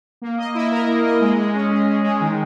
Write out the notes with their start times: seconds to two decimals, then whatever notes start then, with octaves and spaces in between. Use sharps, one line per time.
0.22 A#3
0.38 D#5
0.55 E4
0.71 A#4
0.88 A#3
1.04 D#5
1.21 G#3
1.37 G#3
1.55 C#4
1.71 G#4
1.87 G#3
2.04 G#3
2.21 D#3